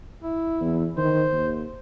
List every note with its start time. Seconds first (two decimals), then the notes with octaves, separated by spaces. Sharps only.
0.23 E4
0.61 E2
0.97 D#3 C5
1.32 D#2